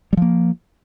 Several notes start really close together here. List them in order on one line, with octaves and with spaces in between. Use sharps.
G3 F3 A#3